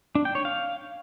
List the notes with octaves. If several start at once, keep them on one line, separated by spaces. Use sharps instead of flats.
D4
G5
C#5
F5